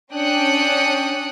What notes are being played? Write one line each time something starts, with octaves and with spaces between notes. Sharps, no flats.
C#4 D4 G5 D#6 F#6 C#7